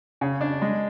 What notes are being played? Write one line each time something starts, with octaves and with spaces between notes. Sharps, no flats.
C#3
D4
G#3